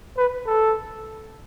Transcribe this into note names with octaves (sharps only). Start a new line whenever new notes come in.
B4
A4